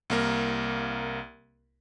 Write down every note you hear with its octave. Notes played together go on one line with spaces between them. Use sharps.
C2 A#3 A#4